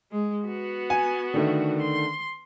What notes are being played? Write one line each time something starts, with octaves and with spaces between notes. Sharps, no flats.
G#3
B3 F#4
G#5
D3 D#3 A3
C6